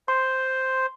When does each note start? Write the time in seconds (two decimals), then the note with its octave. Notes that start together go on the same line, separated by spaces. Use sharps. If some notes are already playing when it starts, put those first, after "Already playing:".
0.08 C5 C6